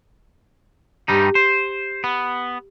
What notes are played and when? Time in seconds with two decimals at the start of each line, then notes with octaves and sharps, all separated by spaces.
1.08 G2 G3 D#4 G4
1.35 C5
2.04 B3